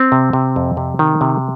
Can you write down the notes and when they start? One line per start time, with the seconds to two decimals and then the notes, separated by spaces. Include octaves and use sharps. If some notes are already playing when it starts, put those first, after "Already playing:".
Already playing: C4
0.12 C3
0.33 C3
0.56 F2
0.77 C3
0.99 D#3
1.21 C3